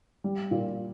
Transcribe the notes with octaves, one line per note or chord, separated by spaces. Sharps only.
G3
A#2